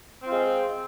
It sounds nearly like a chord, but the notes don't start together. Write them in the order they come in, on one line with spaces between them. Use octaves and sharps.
C4 F4 G#3